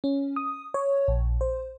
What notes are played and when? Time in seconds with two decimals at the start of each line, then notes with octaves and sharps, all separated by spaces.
0.04 C#4
0.36 D#6
0.74 C#5
1.08 A#1
1.41 C5